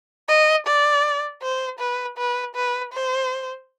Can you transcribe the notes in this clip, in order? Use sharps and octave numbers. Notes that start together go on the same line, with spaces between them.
D#5
D5
C5
B4
B4
B4
C5